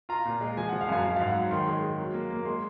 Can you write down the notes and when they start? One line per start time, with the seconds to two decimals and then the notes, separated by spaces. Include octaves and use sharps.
0.09 F4 A#5
0.25 A#2
0.41 G#3
0.57 F3 G#5
0.69 F3 F#5
0.81 F5
0.89 F#2 G#5
1.04 F#3 F5
1.16 G#2 F5
1.27 F#5
1.36 F#3
1.51 D#3 C6
1.67 G#3
1.83 G#3
1.99 F#3
2.14 A#3
2.30 A#3
2.45 G#3 C6